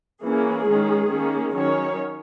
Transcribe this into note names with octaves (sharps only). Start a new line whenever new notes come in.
E3 A#3 C#4 G#4
D#3 G#3 C#4
D#3 A#3 C#4
D#3 F#3 C#4 C#5